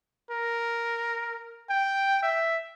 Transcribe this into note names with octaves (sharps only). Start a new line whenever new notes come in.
A#4
G5
E5